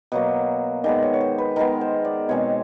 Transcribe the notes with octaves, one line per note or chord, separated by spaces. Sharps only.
B2 F#3 A#3
D#3 G#3 B3 D5
C#5
C#5
C5
B4
D#3 G#3 B3 A#4
C5
D5
B2 G#3 C4 C#5